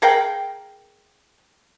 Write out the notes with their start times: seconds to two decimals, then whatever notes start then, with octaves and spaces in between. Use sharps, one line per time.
0.02 G#4 A#4 F5 G5